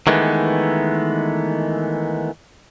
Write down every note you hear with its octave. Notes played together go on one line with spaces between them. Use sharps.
D#3 E3 G#3 A3 B3